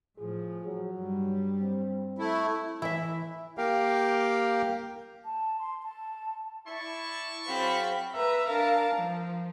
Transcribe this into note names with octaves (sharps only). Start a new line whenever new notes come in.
A2 F3 G#4
F#3
G2 G3
C4
A3 E4
E3 E4 E5
A#3 G4 A#4 F5 G5
A5
C6
A5
E4 D5 A5 C#6
F#3 C4 G#4 F5 B5
B4 E5 A#5
D4 A#4 F5 A5 A#5
F3